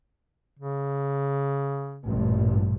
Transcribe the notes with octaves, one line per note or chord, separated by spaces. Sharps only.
C#3
A1 G2 A#2